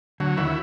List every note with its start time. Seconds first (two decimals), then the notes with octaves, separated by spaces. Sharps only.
0.20 D2 D3 F#3
0.37 D#2 D#3 E4